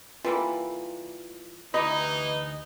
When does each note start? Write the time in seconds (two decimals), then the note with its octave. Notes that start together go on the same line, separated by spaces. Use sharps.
0.25 E3 G3 A#3 F4 A4 B5
1.74 D2 E3 D#4 G4 D#5 B5